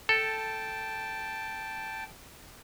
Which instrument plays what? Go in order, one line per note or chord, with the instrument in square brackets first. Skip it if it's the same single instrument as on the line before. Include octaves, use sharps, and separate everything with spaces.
[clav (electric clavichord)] A4 [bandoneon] G5 A5